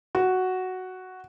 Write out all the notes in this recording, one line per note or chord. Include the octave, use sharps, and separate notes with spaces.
F#4